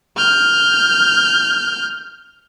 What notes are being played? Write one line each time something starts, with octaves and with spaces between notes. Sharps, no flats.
F6 G6